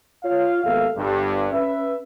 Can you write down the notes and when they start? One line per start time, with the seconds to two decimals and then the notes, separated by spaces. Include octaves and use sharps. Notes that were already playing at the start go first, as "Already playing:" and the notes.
0.24 F4 C#5 F5
0.64 G#1 D#2 B3 A4 E5 F5
0.96 G1 G2
1.52 C#4 B4 E5